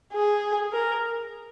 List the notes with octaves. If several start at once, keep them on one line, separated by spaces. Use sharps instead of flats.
G#4
A#4